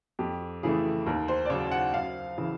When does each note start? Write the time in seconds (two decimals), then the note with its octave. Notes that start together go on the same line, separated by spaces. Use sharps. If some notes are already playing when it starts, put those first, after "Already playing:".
0.19 F2 G4
0.63 C#3 E3 A3 G#4
1.06 D#2 A#4
1.28 C5
1.45 D5
1.49 C#3 F#3 C#5
1.71 F#5
1.93 F#2 F5
2.38 C#3 E3